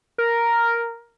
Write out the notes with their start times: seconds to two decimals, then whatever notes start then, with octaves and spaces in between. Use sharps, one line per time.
0.18 A#4